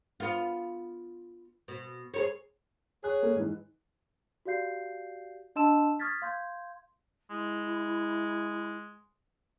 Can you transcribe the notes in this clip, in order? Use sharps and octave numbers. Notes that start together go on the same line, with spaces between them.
B3 F4
B2
G#4 A#4 C#5
G#4 C#5 F#6
A#3
G#2 E3
F#4 G4 D5 F5 G6 C7
D4 D#5 A5 C6 E6 E7
C#6 D#6 F6 G#6 A6 B6
F5 C6 G6 G#6
G#3 E4